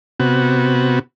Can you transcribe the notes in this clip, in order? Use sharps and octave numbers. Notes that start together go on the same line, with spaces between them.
C3 B3 F#4